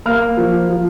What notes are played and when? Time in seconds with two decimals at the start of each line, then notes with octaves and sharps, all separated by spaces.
0.06 A#3 F6
0.37 F3
0.69 F3